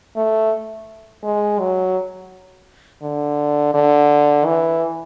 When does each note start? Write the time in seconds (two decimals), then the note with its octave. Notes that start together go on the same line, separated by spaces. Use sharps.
0.16 A3
1.24 G#3
1.59 F#3
3.02 D3
3.74 D3
4.46 E3